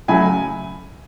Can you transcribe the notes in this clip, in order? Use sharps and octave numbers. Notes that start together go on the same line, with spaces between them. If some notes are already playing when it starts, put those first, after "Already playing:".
C#3 F#3 A3 G#5 B5